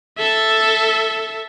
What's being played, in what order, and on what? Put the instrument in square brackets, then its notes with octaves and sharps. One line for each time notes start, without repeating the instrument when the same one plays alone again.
[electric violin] A4 E5